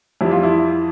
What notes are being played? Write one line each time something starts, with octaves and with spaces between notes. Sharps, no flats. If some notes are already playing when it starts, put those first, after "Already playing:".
F2 E3 G3 E4
F4
E4